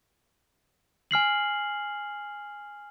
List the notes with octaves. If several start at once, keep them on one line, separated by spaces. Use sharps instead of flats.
G#5 F6 C7 F#7